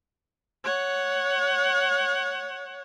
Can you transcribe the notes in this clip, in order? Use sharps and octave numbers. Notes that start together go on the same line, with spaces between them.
C#5 F#5